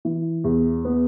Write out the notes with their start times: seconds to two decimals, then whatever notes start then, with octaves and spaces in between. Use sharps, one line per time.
0.05 E3
0.44 E2
0.85 B3